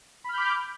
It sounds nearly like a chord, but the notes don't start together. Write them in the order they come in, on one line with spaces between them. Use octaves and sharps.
B5 F6 G6 D6